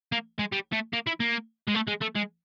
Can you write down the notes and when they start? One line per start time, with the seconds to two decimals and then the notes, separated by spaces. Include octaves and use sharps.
0.12 A#3
0.39 G#3
0.52 G3
0.73 A3
0.93 A#3
1.07 E4
1.20 A#3
1.67 G#3
1.74 A3
1.87 G#3
2.01 A3
2.15 G#3